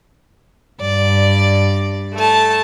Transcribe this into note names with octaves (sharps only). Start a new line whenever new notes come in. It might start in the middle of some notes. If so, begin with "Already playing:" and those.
G2 D5
A3 A5